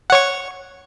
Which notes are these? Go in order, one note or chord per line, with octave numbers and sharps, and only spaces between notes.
C#5 F#5 C#6